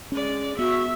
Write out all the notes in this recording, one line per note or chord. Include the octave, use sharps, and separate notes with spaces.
G#3 C#4 D5
B3 F#4 E5